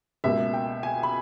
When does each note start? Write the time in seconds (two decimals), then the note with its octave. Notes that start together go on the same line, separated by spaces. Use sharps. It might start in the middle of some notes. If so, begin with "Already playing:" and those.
0.24 C#2 B2 A#3 E5
0.54 G5
0.83 G#5
1.03 B5